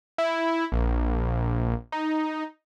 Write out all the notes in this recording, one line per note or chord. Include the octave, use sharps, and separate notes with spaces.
E4
A#1
D#4